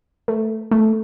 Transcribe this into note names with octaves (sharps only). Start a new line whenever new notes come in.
A3
A3